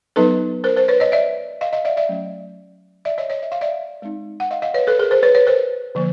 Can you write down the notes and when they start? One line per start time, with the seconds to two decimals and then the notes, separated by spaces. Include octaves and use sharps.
0.16 F#3 B3 D#4 A4 B4
0.64 A#4 C5
0.76 A#4 C5
0.88 B4 C#5
1.00 C#5 D#5
1.12 D5 E5
1.61 D#5 F5
1.73 D#5 F5
1.85 D5 E5
1.97 D5 E5
2.09 F#3 A3 C#4
3.05 D5 E5
3.18 C#5 D#5
3.30 C#5 D#5
3.43 E5
3.52 F5
3.61 D5 E5
4.02 G#3 C4 D#4
4.40 F#5
4.51 D#5 F5
4.62 D#5 F5
4.74 B4 C#5
4.87 A4 B4
4.99 G#4 A#4
5.11 A#4 C5
5.23 B4 C#5
5.35 B4 C#5
5.47 A#4 C5
5.95 D3 F3 A#3